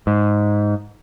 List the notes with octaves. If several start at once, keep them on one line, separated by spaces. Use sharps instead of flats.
G#2